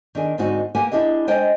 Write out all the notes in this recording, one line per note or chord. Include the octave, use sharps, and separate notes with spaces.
D#3 D4 G#4
G#2 D3 G#3 C4 D#4 F#4
A#3 G4 B4 F#5 G#5
D4 E4 G4 G#4 D#5
G#3 D4 C5 D#5 G5 G#5